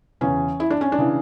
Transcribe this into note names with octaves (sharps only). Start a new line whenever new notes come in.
E2 C#3 E3 C#4
E4
D4
C#4
D4
C#3 E3